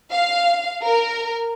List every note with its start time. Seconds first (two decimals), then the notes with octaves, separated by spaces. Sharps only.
0.11 F5
0.83 A#4